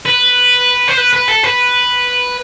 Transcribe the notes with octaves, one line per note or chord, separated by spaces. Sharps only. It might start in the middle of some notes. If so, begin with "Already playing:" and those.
B4
C5
B4
B4
A4
B4